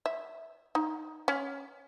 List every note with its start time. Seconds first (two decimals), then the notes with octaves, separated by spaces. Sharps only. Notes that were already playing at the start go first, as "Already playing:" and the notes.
0.06 E5
0.75 D#4
1.28 C#4